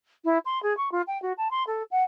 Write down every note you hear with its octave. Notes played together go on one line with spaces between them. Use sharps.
E4
C6
G#4
C#6
F4
G5
F#4
A5
C6
A4
F#5